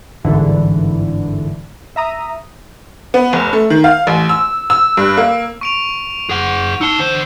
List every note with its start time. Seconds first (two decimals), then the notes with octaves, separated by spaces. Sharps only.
0.25 G1 C2 G#2 D3 E3
1.96 E5 A#5 D#6
3.14 B3
3.33 F1
3.53 A3
3.70 D#3
3.84 F5
4.07 A1
4.29 E6
4.70 E6
4.97 G2
5.17 A#3
5.61 C#6 D7 F7
6.29 G#4 F#5
6.81 D#4 A5 E6 C#7 G7
6.98 D3 C5